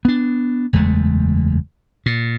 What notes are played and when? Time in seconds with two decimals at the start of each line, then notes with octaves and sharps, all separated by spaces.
0.05 B3 D4
0.73 F#1 E2 G#3 A3
2.06 A#2